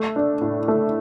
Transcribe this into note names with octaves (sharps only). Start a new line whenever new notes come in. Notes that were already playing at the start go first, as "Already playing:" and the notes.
Already playing: A3
D4
A2
A3